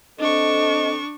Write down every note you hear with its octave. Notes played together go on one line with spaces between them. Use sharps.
C4 D4 A4 D#5 C#6